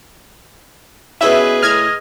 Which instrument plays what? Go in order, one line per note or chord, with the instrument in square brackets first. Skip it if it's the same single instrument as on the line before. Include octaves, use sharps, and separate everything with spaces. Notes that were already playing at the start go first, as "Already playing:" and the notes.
[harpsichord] B2 C#4 E4 [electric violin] G#4 B4 [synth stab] E5
[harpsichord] A2 [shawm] D#5 [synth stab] F6 G#6